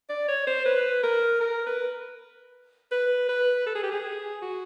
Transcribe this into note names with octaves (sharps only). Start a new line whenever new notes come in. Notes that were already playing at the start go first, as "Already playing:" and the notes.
D5
C#5
C5
B4
A#4
A#4
B4
B4
B4
A4
G#4
G4
G#4
F#4